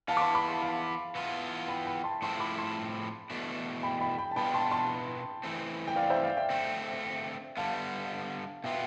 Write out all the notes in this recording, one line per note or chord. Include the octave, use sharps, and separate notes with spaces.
E3 B3 E4 F5 A5
D6
A5 C6
B5 D6
A5 C6
F5 A5
E3 B3 F4
G5 B5
G5 B5
A5 C6
A2 F3 C4 E4 A5 C6
B5 D6
A5 C6
E2 B2 A3 D4
G5 B5
G5 B5
G5 B5
A5
B2 B3 D4 F4 G5 B5
A5 C6
A5 C6
E3 A3 C4
G5
D5 F5
C5 E5
D5 F5
E5 G5
D3 A3 C4
D3 G3 B3 F5 A5
B2 B3 F4 E5 G5